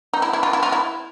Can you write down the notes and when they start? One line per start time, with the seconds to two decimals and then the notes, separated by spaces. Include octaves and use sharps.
0.14 D#4
0.22 E4
0.33 E4
0.43 F4
0.53 E4
0.63 F4
0.72 E4